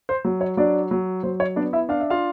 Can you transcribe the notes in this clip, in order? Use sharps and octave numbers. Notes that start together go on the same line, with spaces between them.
C5
F#3
C#5
F#3 D4 D5
F#3
F#3 C5
C#5
B3 D4 D5
E4 E5
D4 F5
E5
F4 F5